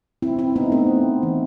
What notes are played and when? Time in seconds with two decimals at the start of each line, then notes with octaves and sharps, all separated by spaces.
0.22 C4 E4
0.39 C4 E4
0.56 B3 D#4
0.72 A3 C4
1.23 E3